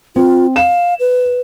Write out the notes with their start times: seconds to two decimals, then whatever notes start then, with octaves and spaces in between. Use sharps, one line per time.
0.16 C4 F4
0.56 F5 E7
1.00 B4